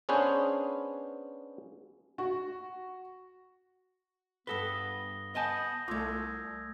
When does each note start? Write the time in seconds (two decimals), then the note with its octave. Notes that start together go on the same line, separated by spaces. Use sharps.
0.09 B3 C#4 D4 G#4 B4 C5
2.18 F#4
4.47 G2 B3 A4 B4 D#6 A#6 G7
5.35 B3 D#5 G#5 A5 D#6 G6 A#6
5.88 C2 A3 F4 D6 E6 G#6